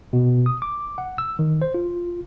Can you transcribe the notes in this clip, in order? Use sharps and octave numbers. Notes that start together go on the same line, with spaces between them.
B2
D#6
D6
F#5
E6
D#3
C5
F4